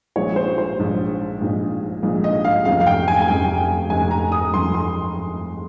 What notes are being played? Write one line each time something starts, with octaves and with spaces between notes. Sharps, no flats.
A#1 A#2 G#3 D#4 C#5
C5
C5
A#1 A#2 G#3 D#4
A#1 A#2 G#3 D#4
A#1 A#2 G#3 D#4
D#5
F5
F1 F2 C#3 F5
F5
G5
G#5
G#5
F1 F2 C#3 G5
F1 F2 C#3 G#5
A#5
D#6
F1 F2 C#3 C6
C6